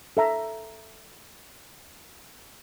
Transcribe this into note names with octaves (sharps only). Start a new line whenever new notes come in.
A4 E5 A#5